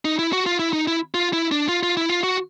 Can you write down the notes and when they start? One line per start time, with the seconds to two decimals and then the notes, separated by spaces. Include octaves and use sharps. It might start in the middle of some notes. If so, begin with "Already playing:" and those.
0.05 D#4
0.19 E4
0.33 F#4
0.46 F4
0.59 E4
0.73 D#4
0.88 E4
1.14 F4
1.33 E4
1.52 D4
1.69 F4
1.83 F4
1.97 E4
2.10 F4
2.23 F#4